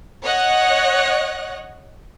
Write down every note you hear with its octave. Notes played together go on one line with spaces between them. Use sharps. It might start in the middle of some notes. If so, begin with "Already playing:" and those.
C#5 D#5 F#5 F#6